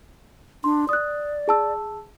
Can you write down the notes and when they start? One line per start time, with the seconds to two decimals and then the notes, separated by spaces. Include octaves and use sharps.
0.64 D4 C6
0.89 D5 D#6 F#6
1.48 G#4 A5 E6